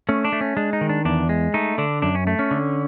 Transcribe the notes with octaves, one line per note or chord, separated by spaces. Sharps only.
A3 C#4
D4
A3
C#4
G#3 D4
D#4
D#3
D4
E2 D4
G#3
A3 D#4
D3 D4
F#2 D4
C#4
A3
C#4
D3